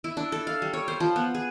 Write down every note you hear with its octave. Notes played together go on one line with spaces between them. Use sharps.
E4
D4
A4
F5
G3
C#5
C5
F3
B3
G#4